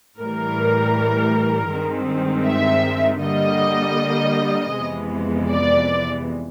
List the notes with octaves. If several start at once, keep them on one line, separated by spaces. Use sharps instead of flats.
A2 E3 G3 A#4
G2 D#3 G#3 C4
E5
D3 G3 A#3 D#5
F2 C3 E3 G#3 B3
D5